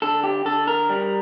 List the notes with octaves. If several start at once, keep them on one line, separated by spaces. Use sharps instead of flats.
D3 A4
G4
D3 A4
A#4
G3